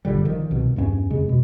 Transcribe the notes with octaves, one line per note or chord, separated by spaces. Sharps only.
G1 A#2 D3 G3
D#3 F3
C2 B2
E2 G2 A3 C#4
F2 C#3 G#3
B2